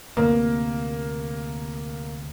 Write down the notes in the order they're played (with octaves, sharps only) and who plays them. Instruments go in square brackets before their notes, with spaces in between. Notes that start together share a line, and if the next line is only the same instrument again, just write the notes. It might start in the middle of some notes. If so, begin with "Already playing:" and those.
[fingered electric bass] D2 C3 [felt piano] A#3